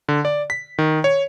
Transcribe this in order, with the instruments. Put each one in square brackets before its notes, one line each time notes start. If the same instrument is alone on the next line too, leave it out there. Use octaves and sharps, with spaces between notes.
[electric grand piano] D3
D5
B6
D#3
C#5